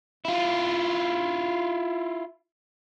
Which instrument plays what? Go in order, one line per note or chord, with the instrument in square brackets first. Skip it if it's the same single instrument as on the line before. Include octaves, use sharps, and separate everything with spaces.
[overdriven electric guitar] E4 F4